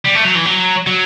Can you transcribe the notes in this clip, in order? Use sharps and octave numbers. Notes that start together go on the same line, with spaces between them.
G3
A3
F#3
E3
F#3
F#3